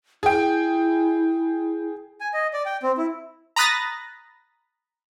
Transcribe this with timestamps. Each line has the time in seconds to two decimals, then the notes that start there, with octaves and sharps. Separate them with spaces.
0.23 E4 G#4 G5
2.21 G#5
2.34 D#5
2.54 D5
2.65 G5
2.83 C4
2.98 E4
3.56 A#5 B5 D#6 F#6 A6 A#6